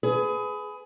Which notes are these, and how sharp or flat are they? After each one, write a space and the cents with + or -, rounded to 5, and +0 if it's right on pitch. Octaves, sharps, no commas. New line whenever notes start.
G#4 +20 B4 +25